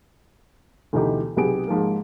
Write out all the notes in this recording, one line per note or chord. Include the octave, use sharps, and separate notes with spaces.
D2 B2 E3 D#4 G4
B1 C3 B3 G4 G#4 D7
G#2 F3 G#3 A#3